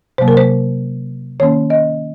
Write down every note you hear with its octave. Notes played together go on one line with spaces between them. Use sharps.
C3 F#3 A#3 C5
A#4
C5
D#3 A#3 C#4 C#5
D#5